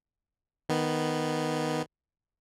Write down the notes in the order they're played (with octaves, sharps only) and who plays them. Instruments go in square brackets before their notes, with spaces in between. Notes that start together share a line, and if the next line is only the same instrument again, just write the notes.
[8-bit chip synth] D#3 B3